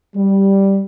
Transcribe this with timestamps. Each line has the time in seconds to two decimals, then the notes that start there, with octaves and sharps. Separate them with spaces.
0.16 G3